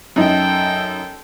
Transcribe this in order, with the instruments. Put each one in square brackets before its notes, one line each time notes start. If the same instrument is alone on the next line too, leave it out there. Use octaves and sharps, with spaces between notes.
[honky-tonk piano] F#2 D#4 [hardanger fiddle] A4 G5